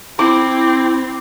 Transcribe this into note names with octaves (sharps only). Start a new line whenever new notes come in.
C4 E4 D6